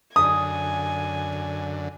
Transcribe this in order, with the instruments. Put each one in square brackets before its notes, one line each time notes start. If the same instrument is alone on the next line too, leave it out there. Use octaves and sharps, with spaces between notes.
[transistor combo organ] F#2 D3 [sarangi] G#5 [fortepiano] D#6